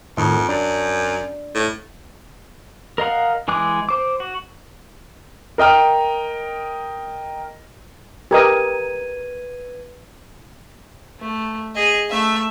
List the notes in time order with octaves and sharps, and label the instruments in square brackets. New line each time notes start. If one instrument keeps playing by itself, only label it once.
[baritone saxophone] F2 [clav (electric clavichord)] A2 D#3
[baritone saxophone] F#2 [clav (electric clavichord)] D4
[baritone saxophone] A2
[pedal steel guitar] A#4 D#5 F5 F#5
E3 G#3 G#4 D6 F#6
C5 D6
F#4
[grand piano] A#4 D#5 G5 F6
[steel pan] G4 A#4 D#5 [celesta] B4 G#6 D#7
[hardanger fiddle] A3
G#4 D#5
A3 E5